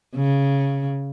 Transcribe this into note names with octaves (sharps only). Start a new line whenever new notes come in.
C#3